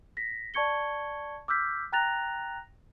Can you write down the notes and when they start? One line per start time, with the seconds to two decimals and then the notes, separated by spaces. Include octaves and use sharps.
0.17 A#6 B6
0.54 D5 A5 C#6 G#6 C#7 G7
1.48 D6 E6 F6 G6 B6
1.92 G5 A#5 F#6 A6 A#6 F7